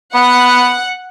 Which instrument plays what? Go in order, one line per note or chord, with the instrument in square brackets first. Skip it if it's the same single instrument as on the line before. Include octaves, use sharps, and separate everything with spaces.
[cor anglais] B3 [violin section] F#5